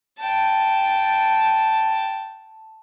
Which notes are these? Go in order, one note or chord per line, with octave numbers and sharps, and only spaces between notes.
G5 A5